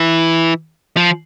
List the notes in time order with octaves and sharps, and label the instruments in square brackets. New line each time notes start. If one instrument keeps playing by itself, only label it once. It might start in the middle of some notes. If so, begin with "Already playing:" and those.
Already playing: [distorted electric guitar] E3
F3